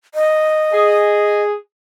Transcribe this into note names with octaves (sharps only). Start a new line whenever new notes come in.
D#5
G#4